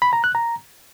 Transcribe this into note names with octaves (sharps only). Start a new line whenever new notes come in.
B5
A#5
F#6
A#5